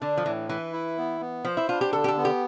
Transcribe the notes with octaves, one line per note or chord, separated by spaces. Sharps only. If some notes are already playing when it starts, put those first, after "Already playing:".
D3 D4
F3
A2 E3
E3 B4
E4
B3
B3
F3 C5
E4
D4 F4
G4
D3 A4
G4
A4
B3
G4